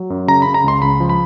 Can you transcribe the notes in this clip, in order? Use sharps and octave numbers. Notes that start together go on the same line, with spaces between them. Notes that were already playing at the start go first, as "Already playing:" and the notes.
Already playing: F#3
F#2
C#3 A#5
C#3 B5
A#5
C#2 C6
C#2 B5
F3
B5